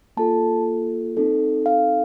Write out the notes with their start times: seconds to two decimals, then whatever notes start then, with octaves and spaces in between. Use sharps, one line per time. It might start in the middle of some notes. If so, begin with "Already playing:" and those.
0.17 A#3 F4 A4 A5
1.17 C4 D#4 A4
1.66 F5